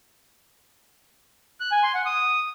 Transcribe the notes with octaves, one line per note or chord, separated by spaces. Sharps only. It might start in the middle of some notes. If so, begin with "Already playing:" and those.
F#6
G#5
C6
F#5
D#6